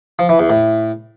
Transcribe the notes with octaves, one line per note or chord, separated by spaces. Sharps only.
F3
E3
E2
A2